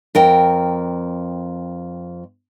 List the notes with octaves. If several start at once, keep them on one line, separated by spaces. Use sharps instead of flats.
F2 A#4 G5